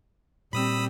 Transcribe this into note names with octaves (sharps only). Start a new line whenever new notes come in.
A#2 G3 C4 B5 D#6 E6